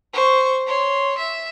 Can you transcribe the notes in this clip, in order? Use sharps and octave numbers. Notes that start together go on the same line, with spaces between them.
C5 C#6
C#5 C6
E5